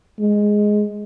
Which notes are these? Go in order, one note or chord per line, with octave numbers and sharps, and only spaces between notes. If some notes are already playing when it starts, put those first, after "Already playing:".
G#3